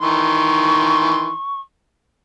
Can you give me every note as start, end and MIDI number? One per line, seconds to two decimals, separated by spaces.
0.02 1.35 51
0.02 1.35 52
0.02 1.35 84
0.02 1.60 85